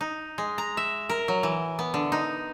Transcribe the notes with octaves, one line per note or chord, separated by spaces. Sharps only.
D#4
G#3
A#5
E5
A#4
F#3
E3
B3
D3
D#4